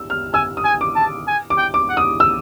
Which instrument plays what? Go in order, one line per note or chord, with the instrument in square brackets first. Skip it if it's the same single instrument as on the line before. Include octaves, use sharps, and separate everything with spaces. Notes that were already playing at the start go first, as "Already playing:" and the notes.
Already playing: [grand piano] E6
F6
[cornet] G#5 [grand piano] E6
[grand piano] D#6
[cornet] G#5
[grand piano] D6
[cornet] A5
G#5
[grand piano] D6
[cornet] G5
[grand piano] D6
[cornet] F#5
[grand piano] D#6
E6